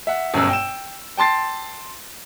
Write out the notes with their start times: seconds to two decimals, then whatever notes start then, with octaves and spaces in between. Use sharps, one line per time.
0.07 E5 F#5
0.34 G1 F#2 B2 E6
0.49 G5 E7
1.17 G5 A5 C6 A6 C7